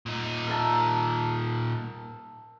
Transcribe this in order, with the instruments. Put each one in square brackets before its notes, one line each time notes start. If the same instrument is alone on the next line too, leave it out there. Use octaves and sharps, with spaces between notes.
[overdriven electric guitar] A#2 D#4
[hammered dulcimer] A#4 E5 A5